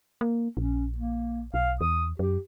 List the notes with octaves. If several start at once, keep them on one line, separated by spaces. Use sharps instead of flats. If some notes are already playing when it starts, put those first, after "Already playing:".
A#3
A#1 C#4
A#3
B1 F5
E2 D#6
F#2 G4